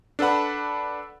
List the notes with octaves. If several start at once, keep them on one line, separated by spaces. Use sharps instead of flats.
D4 A4 B4 F#5 B5